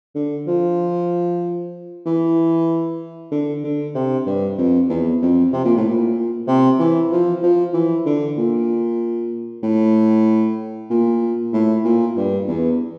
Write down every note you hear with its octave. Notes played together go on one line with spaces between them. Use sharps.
D3
F3
E3
D3
D3
C3
G2
F2
E2
F2
C3
A#2
A2
A#2
C3
E3
F3
F3
E3
D3
A#2
A2
A#2
A2
A#2
G2
E2